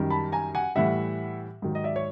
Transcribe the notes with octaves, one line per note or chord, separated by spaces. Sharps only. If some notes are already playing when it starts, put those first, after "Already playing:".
Already playing: F#2 D#3 G3
A5 B5
G#5 A#5
F#5 G#5
A2 E3 G3 E5 F#5
G#2 D#3 F#3
D#5
D5 E5
C#5